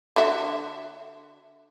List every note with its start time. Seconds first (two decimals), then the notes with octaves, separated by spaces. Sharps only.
0.16 D3 F#4 E5